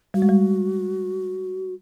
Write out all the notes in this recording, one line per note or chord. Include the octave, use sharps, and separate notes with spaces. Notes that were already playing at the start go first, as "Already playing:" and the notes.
G3 F#4
G#3
G3